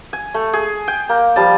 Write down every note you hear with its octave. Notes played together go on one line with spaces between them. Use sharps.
G#5
A3
G#4
G5
A#3
F3 G3 A5